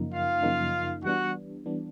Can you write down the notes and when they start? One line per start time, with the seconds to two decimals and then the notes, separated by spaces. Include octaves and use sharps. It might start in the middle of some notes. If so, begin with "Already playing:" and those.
Already playing: F#2 C#3 F3 A#3 D#4
0.12 F4 F5
0.43 F#2 C#3 F3 A#3 D#4
1.04 E3 G3 B3 D4 F#4 F#5
1.65 E3 G3 B3 D4